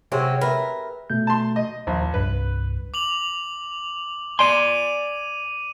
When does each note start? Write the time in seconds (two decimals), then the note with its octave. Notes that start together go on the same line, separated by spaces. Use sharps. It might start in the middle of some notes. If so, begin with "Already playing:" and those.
0.12 C3 F#3 C4 C#4 G#4
0.41 A#4 B4 E5
1.10 B2 A3 G6
1.27 A5 C6
1.56 D#5
1.87 A#1 D#2 C5 A#5
2.14 C2 G2 B4
2.94 D6 F7 F#7
4.39 D5 G#5 C6 D6 D#7